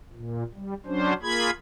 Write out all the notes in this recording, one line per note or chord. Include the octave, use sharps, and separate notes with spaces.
A#2
G3
F#3 C#4 D4 C5
A#3 F4 G#4 B5 G#6